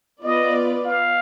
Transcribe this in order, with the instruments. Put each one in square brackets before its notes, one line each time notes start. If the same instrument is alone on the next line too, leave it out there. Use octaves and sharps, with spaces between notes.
[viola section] B3 F4 B4 D5 [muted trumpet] D#5
[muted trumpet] F5